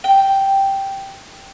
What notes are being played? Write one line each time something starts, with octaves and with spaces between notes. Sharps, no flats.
G5